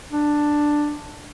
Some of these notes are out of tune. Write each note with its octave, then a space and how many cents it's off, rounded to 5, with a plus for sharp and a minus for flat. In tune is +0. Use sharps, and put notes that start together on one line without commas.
D4 +5